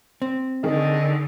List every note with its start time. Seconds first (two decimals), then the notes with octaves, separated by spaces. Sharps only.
0.22 C4
0.64 D3 D#3 G#4 D#5